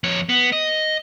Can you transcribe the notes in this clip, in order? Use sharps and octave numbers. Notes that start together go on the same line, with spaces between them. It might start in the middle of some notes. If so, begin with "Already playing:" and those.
F2 C#5
B3
D#5